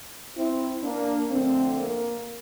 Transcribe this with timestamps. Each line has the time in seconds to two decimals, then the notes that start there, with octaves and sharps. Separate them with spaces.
0.37 C4 E4
0.83 A#3 D4
1.31 F2 D3 A3 C4
1.77 A#3